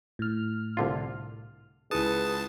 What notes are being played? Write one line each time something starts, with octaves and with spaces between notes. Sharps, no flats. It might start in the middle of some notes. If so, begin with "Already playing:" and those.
A2 F6
C2 D3 F4
C#2 E4 G#4 B4 A5 D#6